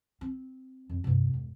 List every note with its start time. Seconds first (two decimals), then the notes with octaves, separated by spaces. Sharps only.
0.21 C4
0.89 F2
1.04 G2 C3
1.34 E1